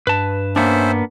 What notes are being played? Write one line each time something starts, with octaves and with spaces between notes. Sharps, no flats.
G2 B4 A5
A#3 B3 C#4 D4 C5 E5